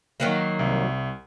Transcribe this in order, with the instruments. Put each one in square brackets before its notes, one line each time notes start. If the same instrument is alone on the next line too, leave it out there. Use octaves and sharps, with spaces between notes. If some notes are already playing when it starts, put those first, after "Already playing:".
[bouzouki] D#3 F#3 A#3
[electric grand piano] C2